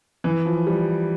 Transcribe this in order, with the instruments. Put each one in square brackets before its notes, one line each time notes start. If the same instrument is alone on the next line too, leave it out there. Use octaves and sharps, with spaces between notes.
[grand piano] E3
F3
G3